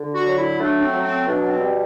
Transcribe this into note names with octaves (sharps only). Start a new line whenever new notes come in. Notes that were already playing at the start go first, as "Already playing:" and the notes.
Already playing: D3
F#4
F#3
E4
A3 D4
C4
F#3
C4
B2 D4
C4
G3